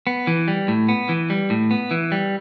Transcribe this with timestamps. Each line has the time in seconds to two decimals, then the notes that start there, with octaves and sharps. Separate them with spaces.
0.07 B3
0.27 E3
0.48 G3
0.68 A2
0.89 B3
1.09 E3
1.30 G3
1.50 A2
1.71 B3
1.91 E3
2.12 G3